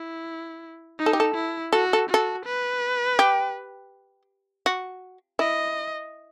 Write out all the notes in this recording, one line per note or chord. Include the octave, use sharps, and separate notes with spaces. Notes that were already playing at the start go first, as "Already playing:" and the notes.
Already playing: E4
D#4
A4
G4
A4
E4
F#4 A4
A4
F#4 A4
B4
G4
F#4
E4 D#5